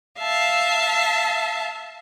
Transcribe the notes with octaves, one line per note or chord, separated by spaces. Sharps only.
E5 F5 A5